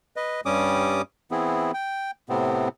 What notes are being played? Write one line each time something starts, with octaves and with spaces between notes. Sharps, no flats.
B4 D#5
G2 G3 C#4 D6 D#6
E3 B3 C4 E4 G#4
G5
A2 C3 B3 C4